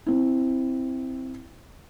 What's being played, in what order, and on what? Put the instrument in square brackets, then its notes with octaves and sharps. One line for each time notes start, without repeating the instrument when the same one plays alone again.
[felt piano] C4 E4